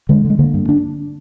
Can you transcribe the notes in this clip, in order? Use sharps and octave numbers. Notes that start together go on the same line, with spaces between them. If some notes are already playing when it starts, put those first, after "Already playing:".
D3 G#3
D3
G#3
D3 A#3
G2
D4